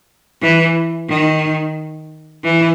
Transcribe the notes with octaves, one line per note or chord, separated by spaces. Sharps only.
E3
D#3
E3